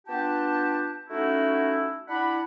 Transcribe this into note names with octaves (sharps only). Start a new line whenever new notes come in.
B3 D4 F4 G4 G5 A5
A3 C#4 D#4 E4 F#4
D4 E4 D5 F#5 B5